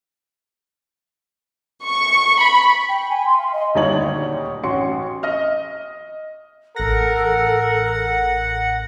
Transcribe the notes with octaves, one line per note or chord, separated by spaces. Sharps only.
C#6
B5
G5
G#5
C6
F5
D#5
D#1 D2 G3 D#4 C#5 F#7
A1 C#4 F#4 C6 C#6 C#7
D#5 F6
A1 A4 A#4 F#5 A#6